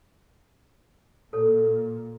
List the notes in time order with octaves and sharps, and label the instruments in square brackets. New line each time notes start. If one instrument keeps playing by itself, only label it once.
[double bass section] A#2 [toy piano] A4 C#5